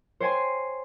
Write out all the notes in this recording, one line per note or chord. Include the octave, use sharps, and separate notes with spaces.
C5 C#5 G5 G#5 C6